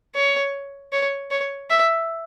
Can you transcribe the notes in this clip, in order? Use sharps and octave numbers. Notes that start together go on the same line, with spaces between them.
C#5
C#5
C#5
E5